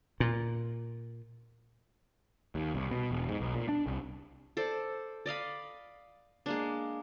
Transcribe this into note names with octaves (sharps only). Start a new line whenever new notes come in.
A#2
D#2
C2
B2
E1
G#2
B1
A#2
D4
C2
A4 C5 D5
D5 D#5 F5 B5
G#3 A#3 D4